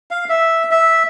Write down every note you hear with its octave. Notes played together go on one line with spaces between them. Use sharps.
F5
E5
E5